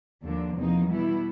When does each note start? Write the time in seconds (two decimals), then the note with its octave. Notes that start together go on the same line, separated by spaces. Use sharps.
0.23 D#2 D3 F3 A#3 D4
0.55 E2 C3 F3 A#3 D#4
0.87 B2 G3 B3 E4